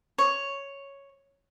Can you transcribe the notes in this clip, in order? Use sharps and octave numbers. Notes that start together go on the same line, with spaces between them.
C#5